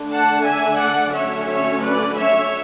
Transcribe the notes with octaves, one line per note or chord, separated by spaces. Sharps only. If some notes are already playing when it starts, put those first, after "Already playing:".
Already playing: D3 A3 D4
F#5 A5
E5 G#5
D5 F#5
D3 F#3 A3 C#4 C#5 E5
C#5 E5
B4 D5
C#5 E5